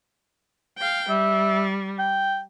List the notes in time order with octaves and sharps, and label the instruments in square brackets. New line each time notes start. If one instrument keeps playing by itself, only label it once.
[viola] F5 G5
[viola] G3 [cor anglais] E5
[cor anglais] G5